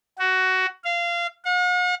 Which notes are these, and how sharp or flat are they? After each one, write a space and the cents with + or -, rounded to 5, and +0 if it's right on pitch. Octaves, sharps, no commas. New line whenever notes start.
F#4 +15
F5 -20
F#5 -45